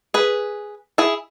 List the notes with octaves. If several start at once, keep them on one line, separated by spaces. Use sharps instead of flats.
G#4 B4
E4 G#4